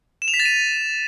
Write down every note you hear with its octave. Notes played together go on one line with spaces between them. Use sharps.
E7
F7
B6
A6
D#7